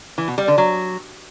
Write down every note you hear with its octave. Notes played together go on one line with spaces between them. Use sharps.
E3
B2
G3
D3
F#3